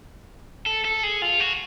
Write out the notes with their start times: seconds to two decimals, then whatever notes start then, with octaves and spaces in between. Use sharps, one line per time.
0.66 A4
0.85 A4
1.03 G#4
1.22 F4
1.40 F#4